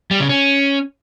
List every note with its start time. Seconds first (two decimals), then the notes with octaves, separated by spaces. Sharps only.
0.11 G3
0.20 C#3
0.29 C#4